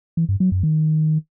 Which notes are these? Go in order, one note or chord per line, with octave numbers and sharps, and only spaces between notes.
E3
G2
F#3
F#2
D#3